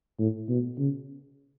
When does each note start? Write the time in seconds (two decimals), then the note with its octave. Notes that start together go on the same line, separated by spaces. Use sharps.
0.20 A2
0.49 B2
0.79 C#3